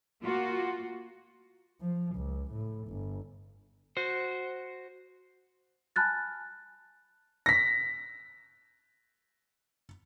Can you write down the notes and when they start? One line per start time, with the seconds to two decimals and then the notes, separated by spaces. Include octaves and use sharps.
0.22 A#3 F4 F#4
1.81 F3
2.16 C#2
2.51 A2
2.88 G1
3.97 F#4 C5
5.96 G#5 A5 B5 F6 F#6 A6
7.46 A#6 B6